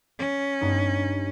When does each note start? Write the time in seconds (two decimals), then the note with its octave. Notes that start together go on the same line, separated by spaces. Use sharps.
0.19 C#4
0.61 G2 B3 D#4